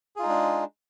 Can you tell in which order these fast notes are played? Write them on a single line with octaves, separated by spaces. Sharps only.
G#4 F4 D#4 G#3 D4